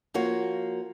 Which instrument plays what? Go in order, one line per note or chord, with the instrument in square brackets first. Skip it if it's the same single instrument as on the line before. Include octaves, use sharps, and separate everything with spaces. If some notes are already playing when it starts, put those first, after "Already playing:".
[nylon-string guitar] F3 A#3 F#4 C#5